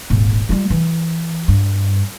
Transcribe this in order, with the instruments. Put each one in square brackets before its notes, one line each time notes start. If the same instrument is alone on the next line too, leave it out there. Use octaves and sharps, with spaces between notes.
[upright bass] D#1 G#1
G3 F4
E3
G2